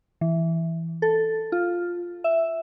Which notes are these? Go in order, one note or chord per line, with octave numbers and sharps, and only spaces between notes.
E3
A4
F4
E5